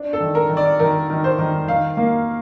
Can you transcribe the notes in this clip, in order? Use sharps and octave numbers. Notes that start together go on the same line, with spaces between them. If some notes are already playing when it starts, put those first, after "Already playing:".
Already playing: D4
A4
D#3
A#4
D#3
D5
D#3 A#4
D#3
C5
D#3
D#3 F5
A#3